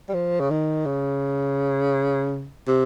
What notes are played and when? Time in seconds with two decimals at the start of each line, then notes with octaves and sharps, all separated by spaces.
0.09 G3
0.14 F3
0.40 C#3
0.50 D#3
0.86 C#3
2.67 C3